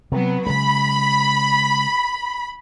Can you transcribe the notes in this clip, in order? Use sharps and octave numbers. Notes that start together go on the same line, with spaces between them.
C3 F#3 B3
C#3 G#3 B5